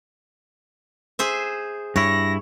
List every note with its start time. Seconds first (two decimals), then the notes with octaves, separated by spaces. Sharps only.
1.19 G#4 C5 E5
1.96 G2 E4 C#5 A#6